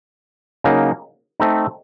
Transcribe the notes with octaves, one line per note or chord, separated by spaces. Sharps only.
C#3 F#3 A#3 D#4
A3 C4 D#4